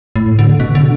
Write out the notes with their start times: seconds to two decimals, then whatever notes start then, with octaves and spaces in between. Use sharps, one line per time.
0.16 A2
0.39 D3
0.60 B2
0.75 D3